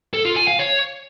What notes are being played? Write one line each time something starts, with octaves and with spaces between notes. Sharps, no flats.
A4
F4
G#5
F5
C#5